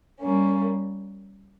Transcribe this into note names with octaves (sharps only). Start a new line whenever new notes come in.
G3 A#3 C#4